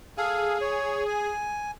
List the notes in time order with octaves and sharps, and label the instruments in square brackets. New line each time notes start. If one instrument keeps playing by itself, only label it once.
[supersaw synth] G#4 [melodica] A4 F5
[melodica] C#5
G#5